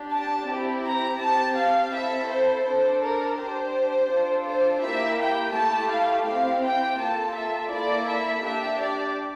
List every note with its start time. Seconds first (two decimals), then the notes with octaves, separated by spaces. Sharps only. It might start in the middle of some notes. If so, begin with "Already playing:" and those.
Already playing: D4 G4
0.14 A5
0.49 C4 E4 G4
0.85 A#5
1.21 C4 G4 A5
1.58 F5
1.94 C4 E4 A4 E5
2.30 C5
2.66 D4 A4 C5
3.02 A#4
3.38 D4 G4 C5
4.11 D4 F4 A4
4.46 C5
4.82 A#3 E4 G4 E5
5.19 G5
5.54 A3 E4 G4 A5
5.90 F5
6.26 C4 E4 G4 F5
6.63 G5
6.99 A#3 F4 A4 A5
7.35 E5
7.71 A#3 E4 A4 D5
8.07 E5
8.43 D4 G4 E5
8.79 D5